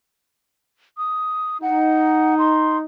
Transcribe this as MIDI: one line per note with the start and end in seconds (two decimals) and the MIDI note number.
0.98 1.58 87
1.62 2.85 63
1.62 2.35 78
2.39 2.77 84